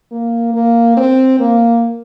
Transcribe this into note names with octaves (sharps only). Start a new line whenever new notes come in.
A#3
A#3
C4
A#3